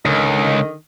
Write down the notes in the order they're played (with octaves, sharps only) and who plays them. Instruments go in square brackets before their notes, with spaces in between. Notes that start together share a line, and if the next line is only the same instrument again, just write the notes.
[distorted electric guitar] C#2 [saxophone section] D3 D#3 D#5